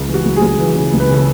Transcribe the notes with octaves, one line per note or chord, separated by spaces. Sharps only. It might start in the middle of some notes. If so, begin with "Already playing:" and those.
Already playing: C#2
E3
F#4
C#2
G#4
C#2
E3
C#3
C#2
B4
C#3 A4